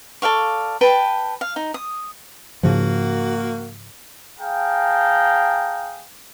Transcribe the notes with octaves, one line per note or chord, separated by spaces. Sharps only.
A4 D5 F5 C#6
B4 G5 A5
F5
D#4
D#6
G#2 C#3 F3 A#3 F#4
G#4 F5 G5 A5 A#5